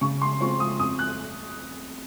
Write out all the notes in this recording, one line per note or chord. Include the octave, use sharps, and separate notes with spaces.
C#3 C#6
C6
G#3 C4 F4 C#6
D#6
F2 D#6
F#6